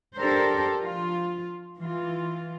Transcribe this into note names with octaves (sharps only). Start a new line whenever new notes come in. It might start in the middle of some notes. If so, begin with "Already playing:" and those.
D4 G4 A4 A#4 C5
F3 F4
E3 F4